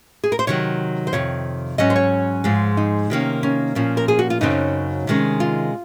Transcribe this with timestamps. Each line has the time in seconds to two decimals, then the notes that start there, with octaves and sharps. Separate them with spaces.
0.24 G#4
0.32 A#4
0.39 C5
0.47 C3 D#3 F#3 C#5
1.07 C5
1.13 F2 C3 D#3 C#5
1.78 G#2 F#3 C#4 D#5
1.90 C5
1.96 C#5
2.44 G#2 F3 G#3
2.77 D#4
3.10 C3 D#3 A#3 C#4
3.43 C#4
3.75 A#2 F3 A#3 C#4
3.97 A#4
4.08 G#4
4.19 F#4
4.30 F4
4.41 F#2 C#3 F#3 C4 D#4
5.07 C3 D#3 G#3 C#4
5.40 F4